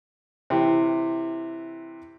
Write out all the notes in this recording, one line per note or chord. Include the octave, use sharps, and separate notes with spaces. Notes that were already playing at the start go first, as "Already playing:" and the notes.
C3 E3